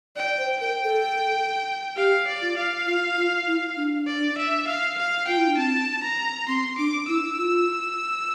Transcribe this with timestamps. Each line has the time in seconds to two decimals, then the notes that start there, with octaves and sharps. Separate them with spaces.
0.16 D5 G5
0.38 C5
0.60 A#4 G5
0.84 A4
1.96 G4 F5
2.27 D5
2.42 F4
2.57 F5
2.87 F4
3.17 F4
3.47 E4
3.77 D4
4.07 D5
4.38 E5
4.67 F5
4.98 F5
5.27 F4 G5
5.37 E4
5.47 D4
5.57 C4 A5
6.02 A#5
6.48 C4 C6
6.77 D4 D6
7.08 E4 E6
7.38 F4